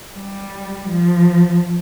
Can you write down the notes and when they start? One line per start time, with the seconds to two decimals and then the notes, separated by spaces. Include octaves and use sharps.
0.17 G3
0.89 F3